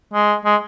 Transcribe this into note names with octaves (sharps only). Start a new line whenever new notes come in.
G#3
G#3